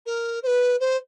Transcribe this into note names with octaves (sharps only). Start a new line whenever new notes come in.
A#4
C5
B4
C5